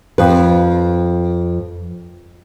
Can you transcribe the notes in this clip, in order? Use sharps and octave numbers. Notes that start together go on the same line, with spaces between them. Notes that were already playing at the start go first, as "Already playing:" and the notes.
F2 B4